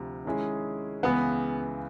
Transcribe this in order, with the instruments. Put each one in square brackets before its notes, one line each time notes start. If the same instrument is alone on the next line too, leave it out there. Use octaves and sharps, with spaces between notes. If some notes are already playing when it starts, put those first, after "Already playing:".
Already playing: [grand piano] D2 C3 F3
D#3 G#3 C#4 E4 G#4
[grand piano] C#2 C#3 E3 [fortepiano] B3